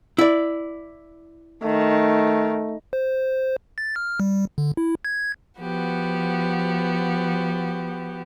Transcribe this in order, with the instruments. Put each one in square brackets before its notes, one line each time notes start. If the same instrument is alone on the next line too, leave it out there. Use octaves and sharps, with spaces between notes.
[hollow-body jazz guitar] E4 D5
[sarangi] D#3 [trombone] A3
[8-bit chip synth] C5
A6
F6
G3
D3
E4
G#6
[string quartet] F3 B3 F#4 G4